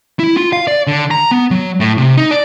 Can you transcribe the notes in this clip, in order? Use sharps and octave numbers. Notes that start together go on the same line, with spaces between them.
E4
F4
F5
D5
D3
A#5
B3
F#3
A2
C3
D#4
D5